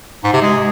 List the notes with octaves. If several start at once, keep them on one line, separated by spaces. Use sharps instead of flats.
G#2
C3
G#3